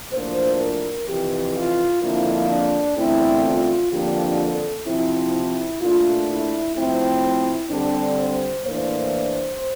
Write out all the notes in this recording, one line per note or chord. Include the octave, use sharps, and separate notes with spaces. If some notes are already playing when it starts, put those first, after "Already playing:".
A2 F3 A#3 D4 C5
A#4
F2 C3 E3 G4
F4
F2 D3 F3 A#3 D4 E4
D4
E2 D3 A3 C4 E4
F4
F2 D3 F3 A#3 D4 G4
A4
C3 F3 C4 E4
E4
A#2 A3 D4 F4
E4
A2 F3 A3 C4 E4
D3 G3 C4 D4
C5
A2 E3 A#3 D4 C5